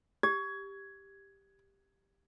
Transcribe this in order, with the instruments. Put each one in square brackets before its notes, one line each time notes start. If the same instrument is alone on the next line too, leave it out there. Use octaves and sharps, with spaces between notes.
[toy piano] G4 [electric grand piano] G#6